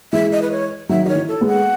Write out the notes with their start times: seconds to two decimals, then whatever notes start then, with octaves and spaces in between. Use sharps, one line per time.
0.13 E3 G#3 E5
0.32 D#5
0.42 B4
0.52 C#5
0.89 D#3 F#3 E5
1.05 D#3 C#5 D#5
1.15 E3
1.28 A4
1.41 G#3 B3
1.47 F#5